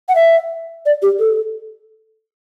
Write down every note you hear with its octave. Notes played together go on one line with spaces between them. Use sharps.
F#5
E5
D5
G4
A4